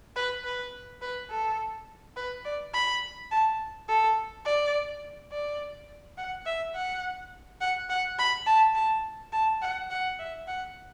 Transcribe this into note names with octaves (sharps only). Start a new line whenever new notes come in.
B4
B4
B4
A4
B4
D5
B5
A5
A4
D5
D5
F#5
E5
F#5
F#5
F#5
B5
A5
A5
A5
F#5
F#5
E5
F#5